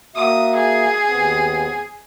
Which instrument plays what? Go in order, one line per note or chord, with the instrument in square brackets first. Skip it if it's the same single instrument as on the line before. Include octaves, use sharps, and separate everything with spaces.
[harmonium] A#3 F#4 E5 [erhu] D#6
[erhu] G#4
[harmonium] D#2 B3 C4